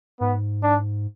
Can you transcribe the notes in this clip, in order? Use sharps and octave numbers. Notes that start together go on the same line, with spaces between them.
G#2 B3
D4